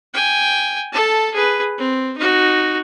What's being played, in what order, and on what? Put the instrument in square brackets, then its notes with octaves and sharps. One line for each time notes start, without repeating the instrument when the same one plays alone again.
[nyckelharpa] G5 G#5
A4 A5
G#4 B4
C4
D#4 F#4